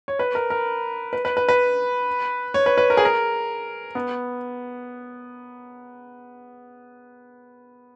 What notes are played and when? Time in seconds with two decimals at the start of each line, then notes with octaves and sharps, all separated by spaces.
0.08 C#5
0.19 B4
0.35 A#4
0.50 A#4
1.13 B4
1.25 B4
1.37 B4
1.48 B4
2.54 C#5
2.66 B4
2.78 B4
2.90 A#4
2.97 G#4
3.05 A#4
3.95 B3